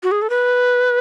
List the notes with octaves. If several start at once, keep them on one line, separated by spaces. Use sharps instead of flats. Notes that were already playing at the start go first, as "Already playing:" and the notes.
F#4
G#4
A4
B4